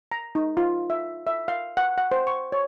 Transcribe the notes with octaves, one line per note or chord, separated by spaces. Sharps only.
A#5
D#4
F4
E5
E5
F5
F#5
F#5
C5
C#6
C#5